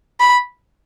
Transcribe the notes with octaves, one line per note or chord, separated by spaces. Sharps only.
B5